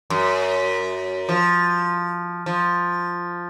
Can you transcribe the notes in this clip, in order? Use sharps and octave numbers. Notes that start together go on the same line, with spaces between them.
F#2
F3
F3